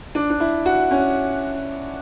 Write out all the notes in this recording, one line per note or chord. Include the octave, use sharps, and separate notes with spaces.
D4
D4
E4
F#4
C#4